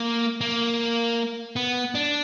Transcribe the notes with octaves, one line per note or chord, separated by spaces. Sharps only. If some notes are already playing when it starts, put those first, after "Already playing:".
Already playing: A#3
A#3
B3
D4